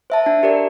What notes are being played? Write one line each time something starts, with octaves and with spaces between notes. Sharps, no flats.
C5 E5 A5
D4
G4 A#4 D5